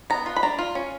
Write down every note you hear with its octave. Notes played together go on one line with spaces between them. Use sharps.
B3 A#5
F4
B5
D4 A#5
F4
C#4